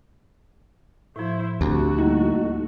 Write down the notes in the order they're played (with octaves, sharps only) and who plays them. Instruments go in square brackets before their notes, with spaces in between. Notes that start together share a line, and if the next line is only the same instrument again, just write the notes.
[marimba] A2 F3 [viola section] E4 C5
[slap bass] D2 [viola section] A3 F#4 [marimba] C4 G4
[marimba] G3 A#3 E4 [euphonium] D#4